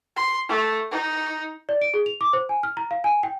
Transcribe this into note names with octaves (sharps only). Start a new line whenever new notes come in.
C6
A3
D#4
D5
D7
G#4
F7
D6
C5
G#5
F6
A#5
F5
G#5
G5